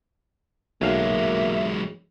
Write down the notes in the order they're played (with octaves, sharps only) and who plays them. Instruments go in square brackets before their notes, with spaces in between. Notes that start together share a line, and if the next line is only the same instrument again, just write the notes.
[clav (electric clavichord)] B1 F5 [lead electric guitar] F#3 G#3 [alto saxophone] A#3 [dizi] E5